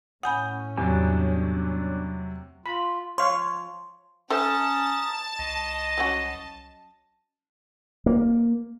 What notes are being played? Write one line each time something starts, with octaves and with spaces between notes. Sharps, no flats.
A2 C#4 F#5 G#5 B5 D#6 G6
E2 C3 F#3 G3 B3 D4
F4 B5
F3 C#5 F5 C6
C#4 A4 C5 E5 A5 A#5 D#6
C2 D#5
F#3 C#4 F#4
A#3